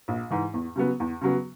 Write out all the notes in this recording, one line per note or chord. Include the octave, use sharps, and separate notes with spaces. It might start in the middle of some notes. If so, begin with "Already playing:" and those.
A#1
G#2 E3
E2
C#3 F#3 B3
E2
C#3 F#3 B3